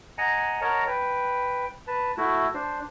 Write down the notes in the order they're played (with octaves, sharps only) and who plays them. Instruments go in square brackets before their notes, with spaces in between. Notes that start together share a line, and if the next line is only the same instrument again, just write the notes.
[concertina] D#5 F#5 G#5 A#5
A#4 C#5 D#5 F#5 A5 A#5
B4 G5
B4 A5
A3 E4 F#4
D4 C5